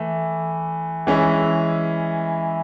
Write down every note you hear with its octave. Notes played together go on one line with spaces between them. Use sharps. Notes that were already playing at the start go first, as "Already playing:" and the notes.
Already playing: E3 A3
E3 G#3 C#4 E4